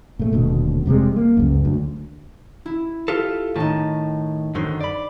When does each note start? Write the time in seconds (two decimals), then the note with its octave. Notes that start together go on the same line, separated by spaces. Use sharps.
0.19 A#2 A3
0.33 D#1 D2 B2
0.86 F1 C3 G3 G#3
1.16 A#3
1.37 C#2 F#2
1.65 D2
2.66 E4
3.08 F4 G4 A4
3.56 A2 D#3 D#4 A5
4.55 F#2 D3 D#3 C5
4.81 D5 B5